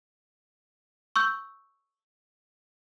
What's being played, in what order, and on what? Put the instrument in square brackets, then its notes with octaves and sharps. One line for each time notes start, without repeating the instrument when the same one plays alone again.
[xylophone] C#6 E6 G6